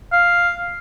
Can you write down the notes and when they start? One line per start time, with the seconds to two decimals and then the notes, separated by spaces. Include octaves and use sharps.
0.12 F5